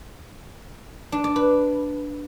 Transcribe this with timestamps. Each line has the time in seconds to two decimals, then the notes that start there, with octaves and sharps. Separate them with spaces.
1.12 D4
1.24 D5
1.36 B4